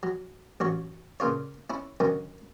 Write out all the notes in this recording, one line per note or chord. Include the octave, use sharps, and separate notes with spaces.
F#3
A1 F#3 C#5
A#2 C#3 F4 C#5
C#4 E4
F#2 D3 D#3 C#4